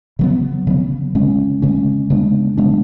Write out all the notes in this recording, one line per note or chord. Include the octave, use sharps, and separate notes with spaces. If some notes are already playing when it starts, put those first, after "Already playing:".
C#3 F#3 B3
C#3 F#3 B3
C#3 G#3 C#4
C#3 G#3 C#4
C#3 G#3 B3 D4
C#3 G#3 B3 D4